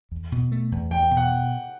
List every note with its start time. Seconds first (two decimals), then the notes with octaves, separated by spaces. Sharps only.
0.11 E2
0.32 B2
0.52 A3
0.72 E2
0.91 E2 G5
1.11 B2
1.17 F#5